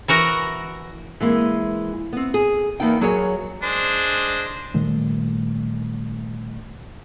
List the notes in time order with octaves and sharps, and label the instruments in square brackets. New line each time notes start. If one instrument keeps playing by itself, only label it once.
[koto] E3 F#4 A#4 A#5
[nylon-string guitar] E3 G#3 A#3 C4
B3 C4
G#4
E2 A#3 B3 D#4 G5
F#3 F#4 G#4 A#4 C#5
[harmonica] G#3 D4 C5
[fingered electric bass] A#2 D#3 G3 A3